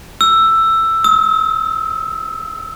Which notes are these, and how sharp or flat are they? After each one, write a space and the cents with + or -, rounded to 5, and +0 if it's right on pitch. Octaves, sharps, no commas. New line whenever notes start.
E6 +10
E6 -45